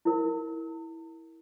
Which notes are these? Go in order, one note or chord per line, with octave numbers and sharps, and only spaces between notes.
E4 A#4